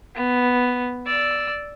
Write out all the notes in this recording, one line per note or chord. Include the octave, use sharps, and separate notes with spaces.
B3
D5 E6